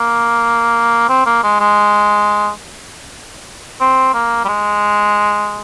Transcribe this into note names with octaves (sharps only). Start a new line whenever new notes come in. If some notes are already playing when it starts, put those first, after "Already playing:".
Already playing: A#3
C4
A#3
G#3
G#3
C4
A#3
G3
G#3